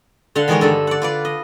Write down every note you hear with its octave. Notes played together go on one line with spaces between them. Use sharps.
D3 F5 F#5 C6
D#3 E3 G#3 G#4 A#4 C#5
G2 D3 A4
D5 F#5
F4 B4 D5
D#5